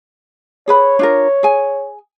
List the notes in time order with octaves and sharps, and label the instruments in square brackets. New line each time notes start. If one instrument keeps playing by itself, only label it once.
[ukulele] G#4 B4 B5 [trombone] C#5
[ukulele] D4 F4 A#4
G#4 G#5